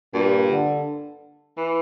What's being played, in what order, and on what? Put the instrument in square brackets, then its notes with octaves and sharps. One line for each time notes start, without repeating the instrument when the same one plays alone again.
[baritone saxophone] G2 [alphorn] A#2
[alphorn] D3
[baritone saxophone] E3